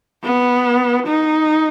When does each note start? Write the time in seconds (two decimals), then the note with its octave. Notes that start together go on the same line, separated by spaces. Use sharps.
0.24 B3
1.07 D#4